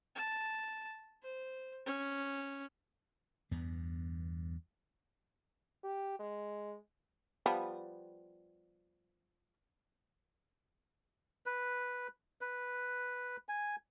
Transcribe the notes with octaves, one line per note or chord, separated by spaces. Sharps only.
A5
C5
C#4
E2 G2 B3
G4
G#3
F3 G3 B3
B4
B4
G#5